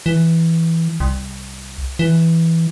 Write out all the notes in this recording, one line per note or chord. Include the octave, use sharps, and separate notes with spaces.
E3
C2
E3